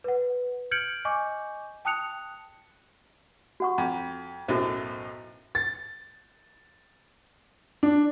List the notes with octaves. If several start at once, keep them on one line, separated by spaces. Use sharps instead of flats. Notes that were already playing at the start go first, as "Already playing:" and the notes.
B4 F#5
F6 G6 G#6 C#7 D7 F#7
D#5 G#5 C#6 D6 G6
G5 A5 D#6 F#6 C#7 F7
F#4 F#5 C#6
F2
B1 F#2 A2 F#4 C5
A6
D4